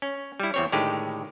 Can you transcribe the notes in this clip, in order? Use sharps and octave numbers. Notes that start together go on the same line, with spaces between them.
C#4
G3 E4
E2 C4 C#5
A2 D3 D#3 G#3 G4